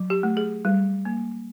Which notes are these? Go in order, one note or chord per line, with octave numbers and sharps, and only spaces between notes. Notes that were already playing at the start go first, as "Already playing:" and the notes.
Already playing: F#3
G4
A3
G#4
G3
A#3